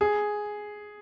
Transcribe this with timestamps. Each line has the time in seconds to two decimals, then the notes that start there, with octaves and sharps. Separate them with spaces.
0.01 G#4